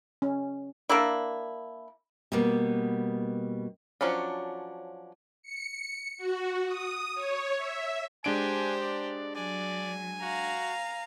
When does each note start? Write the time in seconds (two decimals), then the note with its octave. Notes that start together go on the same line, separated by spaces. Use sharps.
0.22 C#4
0.89 A#3 D4 E4
2.32 B2 G3 A#3 B3
4.01 F3 F#3 C#4 D4
5.43 C#7
6.18 F#4
6.66 D#6
7.15 C#5
7.57 E5
8.24 G#3 D4 G4 C5 G#5 D7
8.81 D5
9.35 F#3 D5 G#5
10.22 F#4 F5 A#5